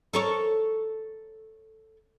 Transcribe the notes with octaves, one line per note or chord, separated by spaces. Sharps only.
A4 A#4 C#5